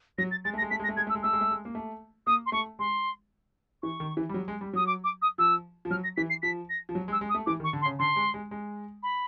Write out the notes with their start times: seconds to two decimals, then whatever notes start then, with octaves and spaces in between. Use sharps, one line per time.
0.18 F#3 A#6
0.31 A6
0.45 G#3 A6
0.54 A3
0.58 A#6
0.62 G#3
0.71 A3 B6
0.79 G#3
0.84 A#6
0.89 A3
0.97 G#3 G#6
1.07 A3 E6
1.15 G#3
1.23 A3 E6
1.33 G#3
1.41 A3
1.51 G#3
1.65 A#3
1.75 A3
2.27 A#3 D#6
2.46 C6
2.52 A3 C#6
2.79 G#3 C6
3.83 E3 C#6
4.00 D#3
4.17 E3
4.29 G3
4.34 F#3
4.48 G#3
4.61 G3
4.73 F#3 D#6
4.87 D6
5.04 D6
5.22 D#6
5.38 F3 E6
5.85 F3
5.90 F#3 F6
6.04 A#6
6.17 E3 B6
6.30 C7
6.42 F3 B6
6.70 A#6
6.89 F3
6.95 F#3
7.08 G#3
7.12 E6
7.21 G#3
7.29 D#6
7.35 A3
7.46 E3 D6
7.60 D#3
7.64 C#6
7.73 D3
7.82 C6
7.86 C#3
7.99 D3 C6
8.16 G#3
8.34 G#3
8.51 G#3
9.03 B5